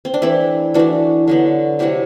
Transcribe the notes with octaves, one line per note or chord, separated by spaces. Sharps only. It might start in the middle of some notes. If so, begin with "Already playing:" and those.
C4
D4
E3 A3 C4 E4
E3 A3 D4 F#4
D3 F#3 B3
C3 F#3 A3 E4 G4